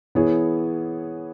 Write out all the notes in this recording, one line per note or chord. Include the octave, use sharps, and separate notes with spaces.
E3 B3 E4 G#4 C#5